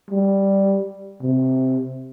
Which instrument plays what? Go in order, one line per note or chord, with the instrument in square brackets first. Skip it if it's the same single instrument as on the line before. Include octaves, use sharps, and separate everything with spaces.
[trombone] G3
C3